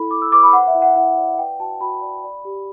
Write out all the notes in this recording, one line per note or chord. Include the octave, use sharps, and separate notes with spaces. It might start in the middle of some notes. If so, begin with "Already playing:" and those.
Already playing: E4 A4 B5
E4 D6
E6
C5 D6
B5
B4 F#5
E5
E4
F#5
E4 F#5
D5
B4 G5
F#4 A5
F#4 B5
D5
D5
G4